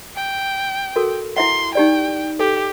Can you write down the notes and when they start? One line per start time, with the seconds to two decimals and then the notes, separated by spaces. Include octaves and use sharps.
0.16 G5
0.96 F#4 A4 A#4
1.37 E4 E5 F#5 C6
1.75 D#4 G4 D5 G5
2.39 G4 A4